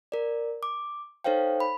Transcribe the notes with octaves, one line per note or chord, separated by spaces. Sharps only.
A#4 D5
D6
D#4 A4 C5 C#5 F5 G5
B5